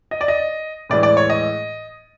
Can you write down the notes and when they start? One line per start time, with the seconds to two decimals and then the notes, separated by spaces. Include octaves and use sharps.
0.11 D#5
0.21 D5
0.28 D#5
0.90 A2 E3 G#3 D5
1.03 D5
1.17 C#5
1.30 D#5